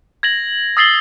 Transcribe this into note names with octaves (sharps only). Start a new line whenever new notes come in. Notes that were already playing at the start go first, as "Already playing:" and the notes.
G#6 A#6 F#7
D#6 E6 A6 C7 F#7 G7